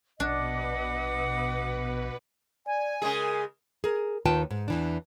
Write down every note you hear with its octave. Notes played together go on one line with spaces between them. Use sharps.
A#1 B2 D4 B4 D#5 F#5 D6
D5 G#5
C#3 G#3 G#4 A#4 D#6
G#4 A#4
D#2 D#3 F4 B4 G5 A5
G#2
E2 E3 D4